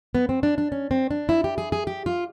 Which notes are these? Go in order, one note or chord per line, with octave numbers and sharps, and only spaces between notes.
B3
C4
D4
D4
C#4
C4
D4
E4
G4
G#4
G#4
G4
F4